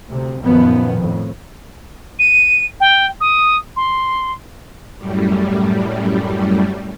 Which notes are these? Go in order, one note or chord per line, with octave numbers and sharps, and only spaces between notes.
D2 C3
F#2 A#2 D#3 F3 B3
F2 A2
D#7
G5
D#6
C6
F#2 A2 G3